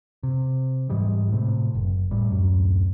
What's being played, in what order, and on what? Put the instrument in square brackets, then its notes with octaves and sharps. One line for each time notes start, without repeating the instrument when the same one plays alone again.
[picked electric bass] C3
G#2 E3 G3 G#3
A2 C3
F#1
A2 G3
D1 F#2